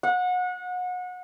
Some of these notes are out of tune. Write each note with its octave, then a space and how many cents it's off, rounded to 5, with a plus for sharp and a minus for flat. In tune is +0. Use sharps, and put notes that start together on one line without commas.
F#5 -30